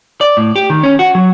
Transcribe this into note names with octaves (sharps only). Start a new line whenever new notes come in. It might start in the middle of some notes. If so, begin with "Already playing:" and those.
D5
A2
G4
D#3
C#4
F#4
F#3